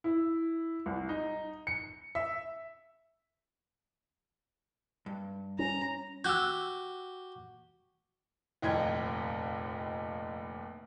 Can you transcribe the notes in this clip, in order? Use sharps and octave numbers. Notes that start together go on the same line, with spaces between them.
E4
C2
D#4
C#7
E5
G2
C#4 A#5
F#4 G4 E6 F#6
F1 A#1 D#2 D#5 G5 G#6